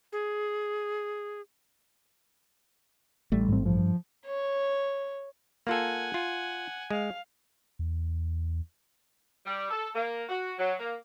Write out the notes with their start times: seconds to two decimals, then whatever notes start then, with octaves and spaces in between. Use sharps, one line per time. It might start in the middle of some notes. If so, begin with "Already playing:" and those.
0.12 G#4
3.32 A1 G3 A3
3.48 G#2 C4
3.65 G2 F3
4.26 C#5
5.67 A#3 F4 A4 F#5 G#5
6.14 F4
6.91 G#3 F5
7.79 E2
9.45 G3
9.70 A4
9.95 A#3
10.29 F#4
10.59 F#3
10.79 A#3